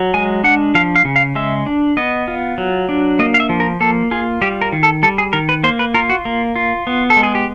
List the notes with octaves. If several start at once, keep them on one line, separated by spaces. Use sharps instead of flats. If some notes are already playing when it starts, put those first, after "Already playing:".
Already playing: F#3
G#3 G#5
D4 F#5
F3 F5
F5
C#3
F5
G#3 E5
D4
B3 D#5
F4
F#3
D4
A#3 D#5
F5
E5
F3
A#4
A#3 A4
F4 G#4
G3 G4
A#4
D#3
A4
G3 A4
G#4
D#3 A#4
B4
A#3 C5
B4
F4 A#4
F#4
A#3
F4
B3
A4
G#3
G#4
G4